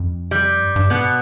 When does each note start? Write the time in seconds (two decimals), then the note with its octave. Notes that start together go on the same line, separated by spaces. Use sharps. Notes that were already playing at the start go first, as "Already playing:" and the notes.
Already playing: F2
0.31 G3
0.61 G2
0.76 G2
0.90 G#2 B2 B3